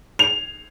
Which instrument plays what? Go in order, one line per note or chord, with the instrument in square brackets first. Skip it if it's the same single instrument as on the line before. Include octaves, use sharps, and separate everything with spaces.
[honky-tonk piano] F7